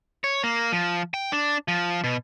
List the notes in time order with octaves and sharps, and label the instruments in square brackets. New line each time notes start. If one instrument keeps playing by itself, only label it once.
[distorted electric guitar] C#5
A#3
F3
G5
D4
F3
B2